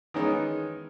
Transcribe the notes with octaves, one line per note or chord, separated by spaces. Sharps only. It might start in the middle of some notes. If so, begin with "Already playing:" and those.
D#3 E3 G#3 B3 C#4 D#4